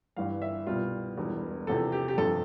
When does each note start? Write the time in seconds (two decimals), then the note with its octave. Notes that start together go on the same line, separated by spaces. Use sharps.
0.17 G1 G2 E3 G3 F5
0.42 E5
0.67 C2 B2 G3 F4
1.17 E1 E2 B2 G3
1.67 E2 C3 F3 A4
1.92 G4
2.08 G4
2.17 G1 F2 C3 F3 A4